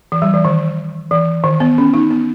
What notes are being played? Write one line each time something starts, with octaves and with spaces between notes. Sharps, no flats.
E3
G3
E3
D#3
E3
D#3
B3
C#4
D#4
B3